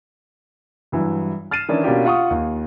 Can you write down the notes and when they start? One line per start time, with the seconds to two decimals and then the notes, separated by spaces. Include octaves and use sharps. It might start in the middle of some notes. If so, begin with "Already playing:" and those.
0.92 G2 E3 F#3
1.51 F6 A6 C7 D#7 E7
1.69 D#3 E3 C#4 D4 E4
1.84 B2 A#3 C#4 D4 F4 G4
2.05 F4 F#5 C#6 D#6
2.30 D#2